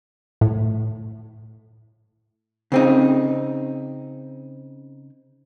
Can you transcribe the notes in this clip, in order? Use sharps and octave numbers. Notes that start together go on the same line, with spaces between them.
A2
C#3 C4 D#4